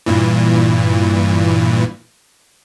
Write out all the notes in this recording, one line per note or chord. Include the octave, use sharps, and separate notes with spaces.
G2 A#2 E3